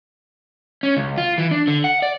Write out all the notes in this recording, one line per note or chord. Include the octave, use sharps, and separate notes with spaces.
C#4
C#2
F4
E3
D4
D3
F#5
D5